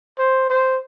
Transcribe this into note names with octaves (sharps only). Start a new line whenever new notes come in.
C5
C5